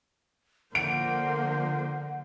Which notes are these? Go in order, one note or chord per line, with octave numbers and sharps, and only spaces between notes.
D3 F3 A#3 C5 F#5 D7